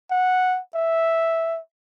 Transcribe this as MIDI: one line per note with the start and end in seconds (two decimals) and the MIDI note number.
0.11 0.59 78
0.75 1.59 76